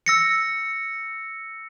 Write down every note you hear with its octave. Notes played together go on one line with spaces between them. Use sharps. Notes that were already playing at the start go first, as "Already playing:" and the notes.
E6 A#6 C#7